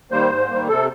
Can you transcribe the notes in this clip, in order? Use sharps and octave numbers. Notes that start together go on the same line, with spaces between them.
D#3 G3 A#3 C5
G#2
D#3 G3 A#3
C3 A4